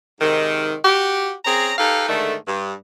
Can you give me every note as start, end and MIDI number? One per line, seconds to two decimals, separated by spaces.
0.21 0.75 44
0.21 0.75 48
0.21 0.75 51
0.84 1.32 66
0.84 1.32 67
1.45 1.73 60
1.45 1.73 61
1.45 1.73 68
1.45 1.73 82
1.77 2.08 63
1.77 2.08 67
1.77 2.08 69
1.77 2.08 71
1.77 2.08 77
2.09 2.35 44
2.09 2.35 50
2.09 2.35 51
2.09 2.35 57
2.47 2.72 43